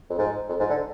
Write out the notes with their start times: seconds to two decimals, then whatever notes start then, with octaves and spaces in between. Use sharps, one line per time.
0.10 F2
0.18 G#2
0.49 F2
0.59 G#2
0.69 D3